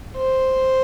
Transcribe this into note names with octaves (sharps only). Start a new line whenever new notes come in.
C5